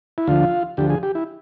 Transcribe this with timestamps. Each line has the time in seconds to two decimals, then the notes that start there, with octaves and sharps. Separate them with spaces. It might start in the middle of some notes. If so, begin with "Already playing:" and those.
0.18 E4
0.27 D2 D3 F3 F4
0.77 D2 D3 F3 G4
0.90 G#4
1.03 G4
1.15 E4